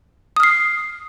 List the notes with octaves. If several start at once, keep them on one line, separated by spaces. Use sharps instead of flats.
D#6 F6 C7